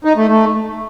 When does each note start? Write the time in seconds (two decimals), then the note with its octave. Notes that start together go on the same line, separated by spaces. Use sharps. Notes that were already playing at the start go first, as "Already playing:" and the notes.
0.05 D#4
0.16 A3
0.28 A3